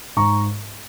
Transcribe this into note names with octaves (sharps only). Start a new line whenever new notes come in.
G#2 A#5 C#6